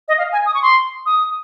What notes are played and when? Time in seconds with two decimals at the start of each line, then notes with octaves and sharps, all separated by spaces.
0.08 D#5
0.18 F5
0.33 G#5
0.46 D#6
0.54 C#6
0.62 C6
1.06 D#6